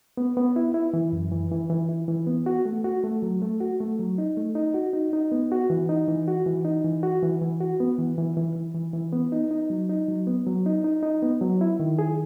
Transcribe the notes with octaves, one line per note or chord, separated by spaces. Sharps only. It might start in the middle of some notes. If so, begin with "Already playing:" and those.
B3
B3
E4
E4
E3
F#2
E3
E3
E3
E4
E3
B3
F#4
A3
F#4
A3
F#3
A3
F#4
A3
F#3
D#4
A3
D#4
F#4
D#4
D#4
B3
F#4
E3
D#4
E3
F#4
E3
D#4
E3
F#4
E3
E3
F#4
B3
E3
E3
E3
E3
E3
E3
B3
D#4
D#4
F#3
D#4
F#3
B3
F#3
D#4
D#4
D#4
B3
F#3
E4
D#3
G#4